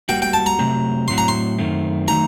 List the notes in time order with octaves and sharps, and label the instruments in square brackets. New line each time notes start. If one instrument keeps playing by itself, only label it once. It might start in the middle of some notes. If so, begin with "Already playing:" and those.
[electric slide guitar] G3 A#3 F#4 [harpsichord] G5
[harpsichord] G5
A5
A#5
[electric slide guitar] C3 F#3 A3 C4 G4
[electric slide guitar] A2 F#3 C4 F#4 [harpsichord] C6
[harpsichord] A#5
C6
[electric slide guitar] F#2 D#3 A3 C4
[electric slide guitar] D#3 F#3 A3 D#4 F#4 [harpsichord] A#5